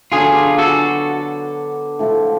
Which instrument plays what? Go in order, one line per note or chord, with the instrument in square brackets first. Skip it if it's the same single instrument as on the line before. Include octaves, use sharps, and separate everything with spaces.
[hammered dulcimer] D3 F#3 B3 D4 [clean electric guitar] F4 G#4
[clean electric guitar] F#4 A4
[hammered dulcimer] A2 F3 A3